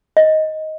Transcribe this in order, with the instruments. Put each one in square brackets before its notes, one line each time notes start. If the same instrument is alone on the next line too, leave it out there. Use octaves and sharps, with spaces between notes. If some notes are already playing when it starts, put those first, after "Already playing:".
[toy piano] D#5